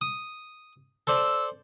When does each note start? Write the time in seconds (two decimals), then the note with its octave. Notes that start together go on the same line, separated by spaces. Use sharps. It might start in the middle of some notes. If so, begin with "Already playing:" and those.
0.01 D#6
1.07 A4 C5 D5 E6